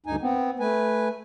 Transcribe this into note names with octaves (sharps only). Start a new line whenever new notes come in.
D2 G2 D#4 G#5
B3 C4
A3 B4 G#5